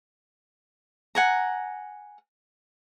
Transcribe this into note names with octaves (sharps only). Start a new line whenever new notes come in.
F#5 G#5 A#5